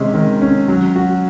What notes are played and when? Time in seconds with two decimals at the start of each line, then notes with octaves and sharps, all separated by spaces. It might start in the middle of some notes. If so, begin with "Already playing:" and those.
Already playing: C3 D#3 G#3 C#4
0.14 D#3
0.42 C#4
0.68 F#3
0.96 F#4